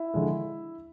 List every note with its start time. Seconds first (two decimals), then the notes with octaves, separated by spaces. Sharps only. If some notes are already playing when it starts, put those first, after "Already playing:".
Already playing: E4 E5
0.14 D3 F3 G#3